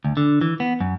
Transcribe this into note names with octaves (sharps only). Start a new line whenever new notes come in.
D2
D3
E3
B3
F#2